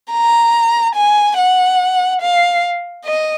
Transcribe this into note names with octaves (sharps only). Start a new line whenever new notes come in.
A#5
G#5
F#5
F5
D#5